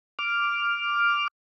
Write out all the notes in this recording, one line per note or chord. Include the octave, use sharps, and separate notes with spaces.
D6 F6